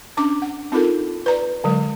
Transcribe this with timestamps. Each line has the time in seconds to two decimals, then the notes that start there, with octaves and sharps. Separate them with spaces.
0.17 C#4 D4 D6
0.42 F#5
0.72 C4 D#4 F4 A4 A#4
1.26 B4 D5 A#5
1.64 D3 F#3 G#3